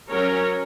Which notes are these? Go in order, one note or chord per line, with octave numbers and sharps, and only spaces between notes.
F#3 C#4 A#4 C#5